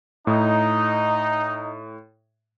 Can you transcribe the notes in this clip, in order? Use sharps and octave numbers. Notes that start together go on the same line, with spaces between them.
A2 D#4